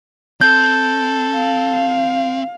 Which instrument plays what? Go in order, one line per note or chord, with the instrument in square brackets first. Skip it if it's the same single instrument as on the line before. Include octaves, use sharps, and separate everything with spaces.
[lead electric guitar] C4 [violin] A4 [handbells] G6
[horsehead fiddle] F5